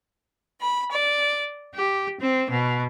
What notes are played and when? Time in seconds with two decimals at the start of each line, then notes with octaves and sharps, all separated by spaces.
0.61 B5
0.91 D5
1.75 G4
2.20 C4
2.51 B2